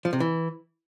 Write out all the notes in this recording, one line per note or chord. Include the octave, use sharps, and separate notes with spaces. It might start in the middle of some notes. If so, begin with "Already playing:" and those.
F3
C3
E3